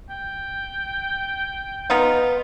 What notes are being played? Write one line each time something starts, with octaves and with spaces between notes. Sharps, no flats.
G5
B3 D#4 F4